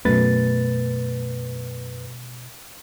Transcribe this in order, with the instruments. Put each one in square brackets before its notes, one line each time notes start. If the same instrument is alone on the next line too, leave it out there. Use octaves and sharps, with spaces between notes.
[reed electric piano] F#2 B4 A6 [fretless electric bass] B2 A3